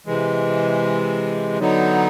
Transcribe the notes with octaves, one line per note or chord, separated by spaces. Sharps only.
C3 E3 G#3
D3 F#3 B3 D#4